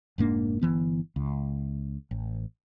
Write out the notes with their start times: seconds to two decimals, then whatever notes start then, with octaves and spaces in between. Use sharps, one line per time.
0.18 F1 G#2 A#3 D4
0.61 G1 D#2 E3 B3
1.16 C#2
2.11 A1